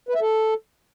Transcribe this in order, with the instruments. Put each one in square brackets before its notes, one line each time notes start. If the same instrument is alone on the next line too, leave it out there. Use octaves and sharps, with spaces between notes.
[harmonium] B4
E5
A4